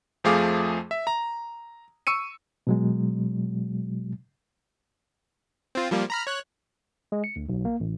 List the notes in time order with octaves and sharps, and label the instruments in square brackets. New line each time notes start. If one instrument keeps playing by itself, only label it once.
[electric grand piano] F2 F3 A3 G#4 F5 D6
E5
A#5
C#6 E6 C#7 D#7
[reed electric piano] B2 F#3 G#3
[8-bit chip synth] C4 F4
F3 G3 A#3
A#5 B5 F6
C#5 F#6
[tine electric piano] G#3
C#7
D2
B1
A#3
A1